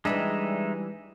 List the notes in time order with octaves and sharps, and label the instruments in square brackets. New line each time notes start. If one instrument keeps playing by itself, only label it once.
[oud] E3 G3 D4 [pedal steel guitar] G#3 D#4 E5